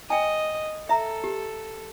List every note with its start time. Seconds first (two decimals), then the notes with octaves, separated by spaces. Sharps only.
0.10 D#5 G5 G#5
0.89 A4 E5 A#5
1.24 G4